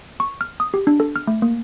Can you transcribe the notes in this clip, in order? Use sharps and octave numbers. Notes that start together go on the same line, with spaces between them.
C#6
F6
D#6
G4
D4
A4
F6
A3
A#3